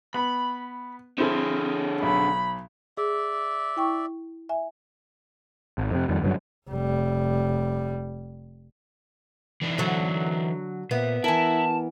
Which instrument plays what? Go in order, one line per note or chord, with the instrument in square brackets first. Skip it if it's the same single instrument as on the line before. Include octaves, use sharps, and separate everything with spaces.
[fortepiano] B3 [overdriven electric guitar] B5
[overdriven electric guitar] D3 G#4 [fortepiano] C4 E4 A4
[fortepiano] B1 [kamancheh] B5
[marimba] G#4 [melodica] D5 E5
[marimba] E4 G5 C#6
E5 G#5
[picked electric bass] G#1
F2 C3
F2 D#3 G3
F#1 G2 D3 F#3
[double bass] F1 G3
[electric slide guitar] E3 D4 D#4
[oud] D3 F#3 [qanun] A4
[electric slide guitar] A#2 [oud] B3 [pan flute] E5
[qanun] E3 A#4 [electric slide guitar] E4 [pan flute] A5